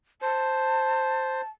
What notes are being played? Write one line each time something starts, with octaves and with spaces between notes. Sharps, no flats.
C5 A5